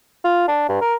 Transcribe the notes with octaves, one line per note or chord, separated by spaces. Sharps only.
F4
D4
G2
A#4